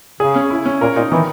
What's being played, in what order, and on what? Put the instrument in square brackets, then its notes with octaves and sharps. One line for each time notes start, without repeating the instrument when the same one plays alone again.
[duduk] C#3 [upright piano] G#4
[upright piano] C#4
E4
C#4
[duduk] A#2 [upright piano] A#4
[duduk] A#2 [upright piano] D#4
[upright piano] D#3 [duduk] E3